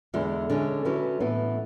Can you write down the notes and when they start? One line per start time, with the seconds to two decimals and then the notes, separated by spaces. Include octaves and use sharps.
0.14 E2 D3 G#3
0.50 D3 G#3 C#4
0.85 D3 F#3 C#4 E4 B4
1.20 A2 E3 B3